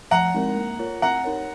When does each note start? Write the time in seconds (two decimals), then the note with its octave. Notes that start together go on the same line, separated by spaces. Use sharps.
0.11 F3 F#5 A#5
0.35 G#3 C4 D#4 A#4
0.56 A#3
0.79 F4 A#4 C#5
1.02 C4 F#5 A#5
1.24 D#4 A#4 C#5